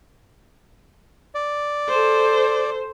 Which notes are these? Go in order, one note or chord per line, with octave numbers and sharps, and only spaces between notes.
D5
A4 C5